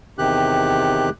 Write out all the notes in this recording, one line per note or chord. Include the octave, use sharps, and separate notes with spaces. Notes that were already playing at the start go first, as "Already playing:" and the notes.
E2 C3 D#3 G4 F#6